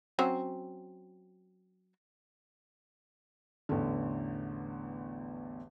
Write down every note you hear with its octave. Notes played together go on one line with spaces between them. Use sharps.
F#3 C4 C#4
A1 E2 D3